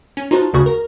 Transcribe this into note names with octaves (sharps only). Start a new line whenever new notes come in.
C#4
D#4 F4 F#4 C5 A5
G1 D2 C#3 F#4 C#6
A#4